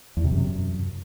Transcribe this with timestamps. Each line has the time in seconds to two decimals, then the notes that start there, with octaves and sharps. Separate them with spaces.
0.17 E2
0.24 C3
0.32 F#2